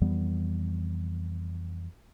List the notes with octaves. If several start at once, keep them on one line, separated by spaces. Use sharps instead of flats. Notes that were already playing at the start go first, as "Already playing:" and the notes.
F2 E3 G3 B3